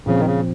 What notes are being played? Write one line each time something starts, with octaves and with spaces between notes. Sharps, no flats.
A#2 C#3 F3 C4
D#3
C#3